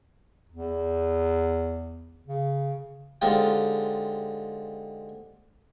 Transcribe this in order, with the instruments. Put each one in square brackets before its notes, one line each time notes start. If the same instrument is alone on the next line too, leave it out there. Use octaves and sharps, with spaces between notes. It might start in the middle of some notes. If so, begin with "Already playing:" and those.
[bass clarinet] E2
C#3
[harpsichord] D3 G#3 C4 D#4 F4 G4